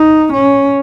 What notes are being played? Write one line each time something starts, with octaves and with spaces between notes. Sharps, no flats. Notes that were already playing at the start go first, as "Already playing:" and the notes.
Already playing: D#4
C#4